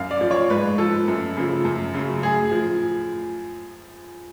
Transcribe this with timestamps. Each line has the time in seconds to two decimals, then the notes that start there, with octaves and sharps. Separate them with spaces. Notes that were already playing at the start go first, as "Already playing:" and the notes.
Already playing: F#2 F5
0.11 D5
0.21 F3
0.31 C#5
0.50 G#2 B4
0.78 F3 A4
1.08 F#2
1.37 C#3 F3
1.65 F#2
1.94 C#3 F#3
2.22 A2 G#4
2.52 F3